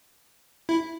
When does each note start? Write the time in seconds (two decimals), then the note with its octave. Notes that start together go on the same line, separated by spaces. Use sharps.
0.69 E4